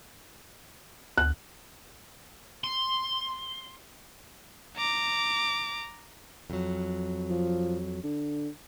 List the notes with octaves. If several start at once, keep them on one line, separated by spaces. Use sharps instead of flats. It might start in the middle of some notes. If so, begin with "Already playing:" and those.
D2 F#6
C6
A#5 D6
F2 F#3
F3
D3